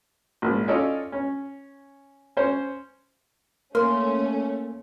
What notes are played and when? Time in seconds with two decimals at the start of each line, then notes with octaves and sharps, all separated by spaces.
0.42 A#1 G#2
0.68 C#4 D#4 F4 A4 D5 D#5
1.12 C#4
2.37 C#4 C5
3.75 A3 A#3 C#4 A#4 C6